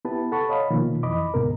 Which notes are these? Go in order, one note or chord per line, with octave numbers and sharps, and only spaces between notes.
B3 E4 G4 B4 A5
A4 F#5 A5 B5 C#6
C#5 D#5 F5 B5
B2 D#3 F3 A#3
F2 E3 D#5 B5 D6
D2 G#2 B2 B3 A#4